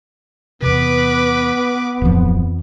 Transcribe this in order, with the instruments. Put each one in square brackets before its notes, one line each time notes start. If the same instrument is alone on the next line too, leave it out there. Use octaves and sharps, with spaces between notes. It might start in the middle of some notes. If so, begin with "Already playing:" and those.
[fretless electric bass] E2 C3 [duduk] B3 [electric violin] B4 D6
[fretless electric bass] D1 F3 [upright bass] F2 E3